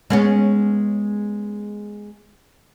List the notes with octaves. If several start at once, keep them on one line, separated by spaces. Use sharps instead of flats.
G#3 B3 C#4